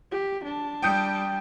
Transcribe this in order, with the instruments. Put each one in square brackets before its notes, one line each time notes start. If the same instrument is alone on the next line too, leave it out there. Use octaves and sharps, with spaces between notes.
[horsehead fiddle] G4
D4 A5
[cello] G3 [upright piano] G5 D#6 G6